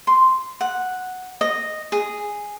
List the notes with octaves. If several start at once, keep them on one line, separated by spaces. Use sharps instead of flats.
C6
F#5
D#5
G#4